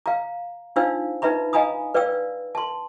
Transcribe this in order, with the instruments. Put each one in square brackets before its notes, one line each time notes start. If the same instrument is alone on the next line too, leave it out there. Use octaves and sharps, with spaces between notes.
[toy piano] F5 A#5
D4 D#4 F4 C5 F5 E6
D#4 B4 E5 A#5 B5
D#5 F5 G#5 A#5 B5 D#6
B4 D5 F5 G5 E6
A5 C6